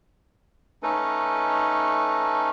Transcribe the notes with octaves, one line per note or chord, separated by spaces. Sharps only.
A3 C#4 D#4 A4 B4